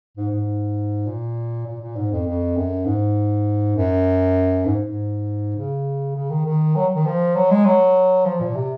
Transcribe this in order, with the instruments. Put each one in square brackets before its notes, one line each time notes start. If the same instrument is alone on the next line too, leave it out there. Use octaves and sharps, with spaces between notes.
[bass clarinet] G#2
G#2
A#2
A#2
A#2
G#2
F2
F2
F#2
G#2
F#2
G#2
G#2
C#3
C#3
D#3
D#3
F#3
D#3
F3
F#3
G#3
F#3
F3
A#2
C3